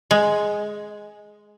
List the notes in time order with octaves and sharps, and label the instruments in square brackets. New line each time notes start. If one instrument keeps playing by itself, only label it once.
[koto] G#3